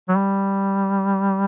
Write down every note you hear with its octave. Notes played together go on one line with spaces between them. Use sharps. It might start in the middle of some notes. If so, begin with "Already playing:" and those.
F#3
G3